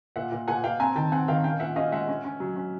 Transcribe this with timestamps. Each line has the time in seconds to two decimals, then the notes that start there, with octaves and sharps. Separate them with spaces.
0.16 A#2 E5 F#5
0.32 A#2
0.48 A#2 F#5 G#5
0.63 A#2 F5 G5
0.80 C4 G#5 A#5
0.96 D#3 G5 A5
1.12 C4 F#5 G#5
1.28 D#3 F5 G5
1.44 C#4 F5 G5
1.60 A#2 E5 F#5
1.76 C#4 D#5 F5
1.92 G#3 E5 F#5
2.09 C#4
2.25 C#4
2.40 F#3
2.57 C#4